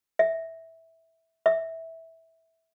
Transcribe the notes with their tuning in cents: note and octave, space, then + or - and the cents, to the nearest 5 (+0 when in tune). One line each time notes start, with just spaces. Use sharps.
E5 -10
E5 -15